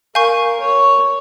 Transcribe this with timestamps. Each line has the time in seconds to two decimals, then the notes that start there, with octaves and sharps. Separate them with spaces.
0.15 A#4 F5 G#5 C#6 G6
0.60 C#5